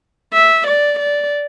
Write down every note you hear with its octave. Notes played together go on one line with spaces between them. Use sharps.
E5
D5
D5